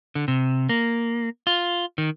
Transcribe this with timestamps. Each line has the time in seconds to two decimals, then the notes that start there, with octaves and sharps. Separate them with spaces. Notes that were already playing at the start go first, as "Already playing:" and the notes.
0.15 D3
0.28 C3
0.69 A#3
1.47 F4
1.98 D#3